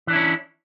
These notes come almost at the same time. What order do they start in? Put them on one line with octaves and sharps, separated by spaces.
E3 D4 E4 C#4